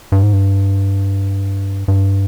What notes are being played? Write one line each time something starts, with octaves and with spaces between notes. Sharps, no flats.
G2
G#2
G2
G2